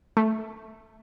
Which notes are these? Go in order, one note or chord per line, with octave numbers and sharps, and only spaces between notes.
A3